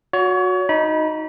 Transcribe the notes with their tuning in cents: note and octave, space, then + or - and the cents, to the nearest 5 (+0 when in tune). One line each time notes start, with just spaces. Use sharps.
F#4 -20 C#5 +30
D#4 +0 B5 -25